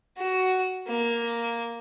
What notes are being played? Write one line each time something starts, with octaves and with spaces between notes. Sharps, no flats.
F#4
A#3